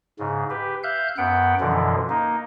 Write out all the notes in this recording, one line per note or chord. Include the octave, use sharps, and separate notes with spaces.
G#2 C#3
G4 B4
E5 F5 F#6 G6
F#2 B3 F#5 G5
F#2 B2 D3 E3 F3
A#3 D#4